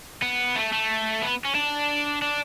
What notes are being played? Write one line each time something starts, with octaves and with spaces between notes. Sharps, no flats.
B3
A3
A3
B3
C#4
D4
D4